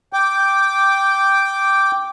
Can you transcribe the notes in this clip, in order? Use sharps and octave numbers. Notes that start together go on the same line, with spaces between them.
G5 D6